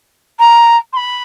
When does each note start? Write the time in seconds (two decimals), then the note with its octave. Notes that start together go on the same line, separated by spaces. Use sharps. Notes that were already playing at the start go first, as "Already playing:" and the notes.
0.39 A#5
0.93 C6
0.97 B5